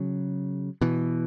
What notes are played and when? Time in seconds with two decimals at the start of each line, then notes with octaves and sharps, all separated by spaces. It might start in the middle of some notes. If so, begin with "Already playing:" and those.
Already playing: C#3 F#3
0.81 B2 E3